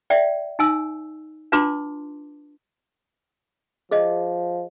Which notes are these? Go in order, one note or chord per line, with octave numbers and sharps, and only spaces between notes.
D5 E5 G5
D#4 G#5 E6
D4 F4 B4 A5 C6 D6
F3 G#4 D#5